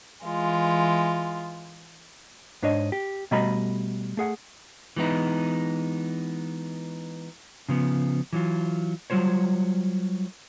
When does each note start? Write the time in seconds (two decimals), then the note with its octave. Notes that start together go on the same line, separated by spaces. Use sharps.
0.24 E3 G#3 F4
2.62 G#2 D4 C#5 D#5
2.92 G4
3.31 B2 G3 A3 D#5 A#5 B5
4.17 A3 G#4 F#5
4.96 E3 G#3 B3 D#4
7.69 C#3 F3 B3
8.33 E3 F#3 F4
9.10 F#3 G3 F4 C5 C#5